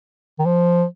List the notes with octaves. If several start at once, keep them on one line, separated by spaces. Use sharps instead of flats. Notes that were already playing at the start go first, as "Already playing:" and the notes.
D#3
F3